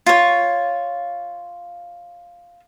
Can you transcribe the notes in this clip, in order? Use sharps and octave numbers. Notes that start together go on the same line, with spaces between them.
F4 C#5